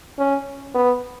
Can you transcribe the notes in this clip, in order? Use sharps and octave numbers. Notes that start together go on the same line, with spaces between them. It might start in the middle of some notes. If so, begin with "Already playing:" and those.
C#4
B3